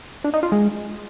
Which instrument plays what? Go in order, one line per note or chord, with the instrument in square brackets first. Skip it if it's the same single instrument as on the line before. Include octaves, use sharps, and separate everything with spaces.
[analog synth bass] D4
D#4
F4
G#3